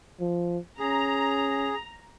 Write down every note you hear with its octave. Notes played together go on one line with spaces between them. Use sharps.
F3
C#4 G#4 A#5